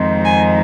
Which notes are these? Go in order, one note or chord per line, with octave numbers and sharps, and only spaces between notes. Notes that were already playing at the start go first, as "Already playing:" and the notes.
Already playing: F2 D#3 G#3 C4 D#4
G#5